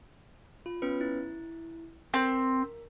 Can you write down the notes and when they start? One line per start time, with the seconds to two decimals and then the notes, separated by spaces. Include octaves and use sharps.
0.66 F4
0.82 B3 C#4 B4
1.01 E4
2.14 C4 A#4